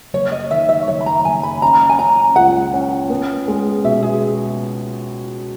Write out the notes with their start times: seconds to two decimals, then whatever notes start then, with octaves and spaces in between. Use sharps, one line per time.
0.14 F#1 C#5
0.32 D#5
0.51 D#3 E5
0.69 E5
0.87 F#1 C#5
1.01 B5
1.06 A#5
1.25 F#1 G#5
1.43 B5
1.62 C#4 A#5
1.89 G#5
1.99 C#4 A#5
2.36 C#2 F#5
2.74 C#4
3.10 B3
3.48 G#3
3.84 B2 E5
4.02 G#4